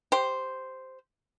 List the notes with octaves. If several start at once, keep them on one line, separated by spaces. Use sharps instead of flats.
G4 C5